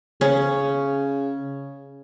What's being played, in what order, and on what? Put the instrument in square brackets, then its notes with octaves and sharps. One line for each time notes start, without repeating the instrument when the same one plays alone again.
[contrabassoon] C#3 [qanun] C#4